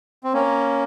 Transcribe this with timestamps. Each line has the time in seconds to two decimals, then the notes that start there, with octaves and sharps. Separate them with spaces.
0.24 C4
0.33 A#3 C#4